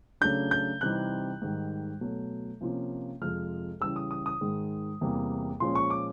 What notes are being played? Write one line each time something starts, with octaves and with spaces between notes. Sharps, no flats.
C#3 F#3 A3 D4 G6
G6
C3 E3 G3 C4 D#4 F#6
G#2 D#3 G3
B2 F#3 A3
C3 F3 A#3 C#4 F4
F2 C3 F3 G#3 F6
C#3 E3 G3 E6
D#6
D#6
D#6
G#2 D#3 G#3
E2 C3 E3 G3 A#3
A#2 F3 G#3 C#4 C6
C#6
D6